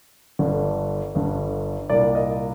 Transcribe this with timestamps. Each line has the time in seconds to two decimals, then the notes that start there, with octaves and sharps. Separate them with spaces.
0.39 G1 G2 D3
1.15 G1 G2 D3
1.89 C2 A#2 D5
2.15 D#5